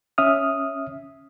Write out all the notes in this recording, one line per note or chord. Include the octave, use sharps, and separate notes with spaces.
C#4 E5 D#6 F6